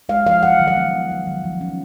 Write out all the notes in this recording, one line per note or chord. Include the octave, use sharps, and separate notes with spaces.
G#3 F5
F3 F5
F#3 F#5
D#3
F5
B3
D#3
F#3
D#3
F3
C#4